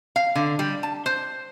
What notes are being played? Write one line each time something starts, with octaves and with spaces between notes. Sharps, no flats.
F5
D3
G3
A5
C5